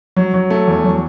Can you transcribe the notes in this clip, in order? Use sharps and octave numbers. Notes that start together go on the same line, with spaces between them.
F#3
F#3
A3
E2
F#3